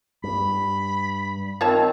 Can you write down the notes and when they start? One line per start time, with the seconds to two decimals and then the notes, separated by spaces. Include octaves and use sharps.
0.24 G2 B5
1.61 D#3 C4 F4 C#5 A5